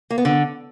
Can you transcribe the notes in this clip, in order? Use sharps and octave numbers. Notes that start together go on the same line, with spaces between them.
A#3
B3
D3